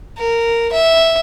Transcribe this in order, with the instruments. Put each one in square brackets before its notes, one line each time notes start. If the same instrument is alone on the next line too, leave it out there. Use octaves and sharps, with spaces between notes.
[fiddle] A#4
E5